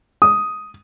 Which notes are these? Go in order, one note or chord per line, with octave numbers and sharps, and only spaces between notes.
D#6